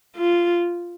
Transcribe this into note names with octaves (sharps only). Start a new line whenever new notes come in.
F4